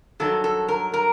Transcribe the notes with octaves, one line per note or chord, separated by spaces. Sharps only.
G2 D#3 F#3 A4
A4
A#4
A#4